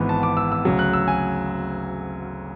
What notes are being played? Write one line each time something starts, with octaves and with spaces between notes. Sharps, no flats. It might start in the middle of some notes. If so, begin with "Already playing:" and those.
Already playing: G#1 G#2 E3 B3
A5
D6
E6
E6
D2 C#3 F#3
F#6
E6
G#5